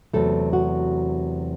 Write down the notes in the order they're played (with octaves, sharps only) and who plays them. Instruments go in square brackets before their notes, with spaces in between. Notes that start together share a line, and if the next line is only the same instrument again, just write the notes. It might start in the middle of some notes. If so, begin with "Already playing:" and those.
[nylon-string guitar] E2 C3 F#3 A3 A4
F#4